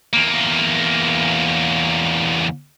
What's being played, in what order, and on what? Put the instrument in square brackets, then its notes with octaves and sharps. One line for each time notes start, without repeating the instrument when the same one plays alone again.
[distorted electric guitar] E2 A#3